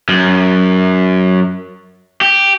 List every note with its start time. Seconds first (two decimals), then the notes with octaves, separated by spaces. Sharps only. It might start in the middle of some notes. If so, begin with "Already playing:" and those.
0.09 F#2
2.21 G4